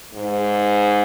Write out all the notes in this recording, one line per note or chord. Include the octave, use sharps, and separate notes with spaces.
G#2